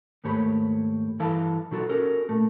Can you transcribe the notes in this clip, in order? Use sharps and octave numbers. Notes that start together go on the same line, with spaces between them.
D#2 G#2 A3 G4 C#5 B5
G2 E3 E4 A4 F5 A5
B2 F#3 D#4 F4 F#4 A4
C#4 F#4 G4 A4 A#4
A#2 A3